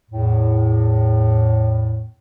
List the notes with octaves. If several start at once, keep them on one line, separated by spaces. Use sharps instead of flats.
E2 A2